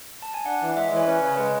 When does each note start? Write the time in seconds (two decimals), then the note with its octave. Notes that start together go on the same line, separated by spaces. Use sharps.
0.22 A5
0.34 G#5
0.46 D4 F#5
0.62 E3
0.76 G#3 E5
0.86 D5
0.92 E3 C#5
1.03 C#5
1.07 C#4 B4
1.17 B4
1.22 C#3
1.28 C#5
1.37 G#3 B4